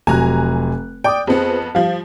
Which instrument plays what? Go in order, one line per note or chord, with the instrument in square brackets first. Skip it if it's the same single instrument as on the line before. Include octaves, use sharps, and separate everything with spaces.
[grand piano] F1 F#3 F#6 [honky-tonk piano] G#5 A#5
[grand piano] D5 D6 D#6 [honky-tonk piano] G5
[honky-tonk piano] F2 B3 [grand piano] C4 G#4
[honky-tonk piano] F3 G3 [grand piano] F5